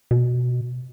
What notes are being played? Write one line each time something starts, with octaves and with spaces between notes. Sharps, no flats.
B2